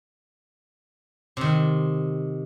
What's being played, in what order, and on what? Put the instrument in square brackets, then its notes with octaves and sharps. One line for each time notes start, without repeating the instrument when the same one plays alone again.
[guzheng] C3 D#3